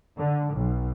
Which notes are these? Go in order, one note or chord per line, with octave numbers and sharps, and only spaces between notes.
D3
B1